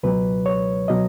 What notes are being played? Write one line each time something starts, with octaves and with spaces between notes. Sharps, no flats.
C#2 B2 F#3 B4
C#5
B2 F#3 D#5